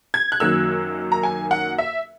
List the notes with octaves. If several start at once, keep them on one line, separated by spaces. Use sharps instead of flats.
G#6
F#6
F#2 D#3 F#3 A#3 E6
A#5
G#5
F#5
E5